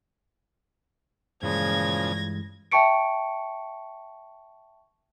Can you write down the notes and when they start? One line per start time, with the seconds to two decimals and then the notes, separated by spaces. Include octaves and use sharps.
1.43 G2 A#2 C#3 E3 F3 G#3 G#6 A#6
2.72 E5 G5 A5 C#6 C#7 D7